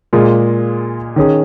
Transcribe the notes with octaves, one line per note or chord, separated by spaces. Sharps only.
A#2 G#3 F4 G#4
D#3 C#4 G#4